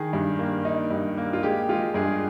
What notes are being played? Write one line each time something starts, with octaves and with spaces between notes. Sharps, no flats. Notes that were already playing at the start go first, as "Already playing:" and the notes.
Already playing: D#3 G#4
G2
A#3
D#4
G2
A#3
F4
G#3 G4
G#3 F4
G2 G#4